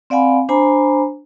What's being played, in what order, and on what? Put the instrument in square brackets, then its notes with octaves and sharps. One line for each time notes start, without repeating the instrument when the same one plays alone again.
[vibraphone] C4 D5 F5 F#5 G#5 B5
D4 C5 G#5 A#5 B5